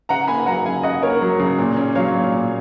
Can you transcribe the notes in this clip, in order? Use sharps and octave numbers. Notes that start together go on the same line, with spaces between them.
C#3 F#5 A#5
A#3 G#5 B5
F#3 F#5 A#5
C#3 F5 G#5
C#3 D#5 F#5
A#3 A#4 C#5
F#3
C#3
A#2
C#4
F#3 C#5 F5
A#2
A#2